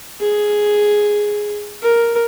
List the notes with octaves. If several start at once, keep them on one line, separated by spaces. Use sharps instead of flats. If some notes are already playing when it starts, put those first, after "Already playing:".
G#4
A#4